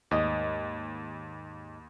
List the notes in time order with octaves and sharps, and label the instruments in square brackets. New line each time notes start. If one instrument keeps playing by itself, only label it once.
[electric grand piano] D#2 [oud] G#2 D#5